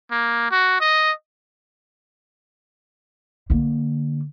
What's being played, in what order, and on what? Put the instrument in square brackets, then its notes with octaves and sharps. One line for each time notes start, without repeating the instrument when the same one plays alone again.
[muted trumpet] A#3
F#4
D#5
[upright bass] D3 A#3